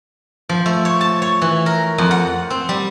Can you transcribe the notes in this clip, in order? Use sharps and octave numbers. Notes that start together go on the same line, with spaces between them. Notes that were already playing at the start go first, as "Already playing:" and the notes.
F3
A3
C#5
A5
C#5
E3
A#4
F2
F#5
C4
G3